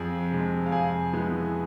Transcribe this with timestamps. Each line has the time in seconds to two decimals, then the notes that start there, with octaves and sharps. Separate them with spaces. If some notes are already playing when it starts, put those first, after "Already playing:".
Already playing: F2 G#4 G#5
0.31 C3 G#3
0.66 F5
0.72 F2 G#4 G#5
1.13 E3 G#3 B3